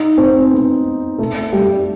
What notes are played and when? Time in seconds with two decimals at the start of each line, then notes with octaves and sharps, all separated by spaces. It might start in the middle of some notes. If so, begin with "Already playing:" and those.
Already playing: D#4 D#5
0.17 C4 C5
0.51 B3 B4
1.18 A3 A4
1.53 G3 G4